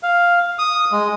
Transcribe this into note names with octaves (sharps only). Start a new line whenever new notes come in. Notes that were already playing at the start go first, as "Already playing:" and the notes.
F5
D#6
G#3